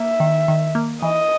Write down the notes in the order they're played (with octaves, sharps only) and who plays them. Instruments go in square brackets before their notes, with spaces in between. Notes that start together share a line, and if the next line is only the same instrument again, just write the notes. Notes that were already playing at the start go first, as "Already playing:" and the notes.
Already playing: [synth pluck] A#3 [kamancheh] E5
[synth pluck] D#3
D#3
A#3
[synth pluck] E3 [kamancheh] D#5